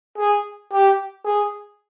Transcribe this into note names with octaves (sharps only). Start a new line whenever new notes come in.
G#4
G4
G#4